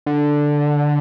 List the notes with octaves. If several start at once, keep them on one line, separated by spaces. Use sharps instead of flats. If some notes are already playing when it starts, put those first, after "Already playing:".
D3